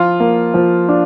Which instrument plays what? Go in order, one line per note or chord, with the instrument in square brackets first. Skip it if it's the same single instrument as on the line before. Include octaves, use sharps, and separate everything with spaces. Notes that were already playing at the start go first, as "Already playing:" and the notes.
Already playing: [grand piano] F3 [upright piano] F4
[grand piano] A#3
F3
D4